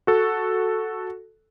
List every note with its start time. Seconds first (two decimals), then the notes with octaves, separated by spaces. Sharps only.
0.07 F#4 A4